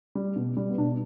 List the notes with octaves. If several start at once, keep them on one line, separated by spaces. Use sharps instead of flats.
G3
B2
G3
B3
B2 D4